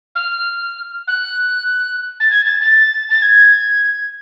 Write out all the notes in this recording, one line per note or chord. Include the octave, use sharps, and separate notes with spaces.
F6
F#6
A6
G#6
A6
A6
A6
G#6